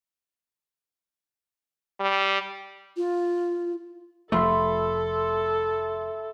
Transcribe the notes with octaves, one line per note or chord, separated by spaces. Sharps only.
G3
F4
F1 F3 A3 A4 E5 B5 C6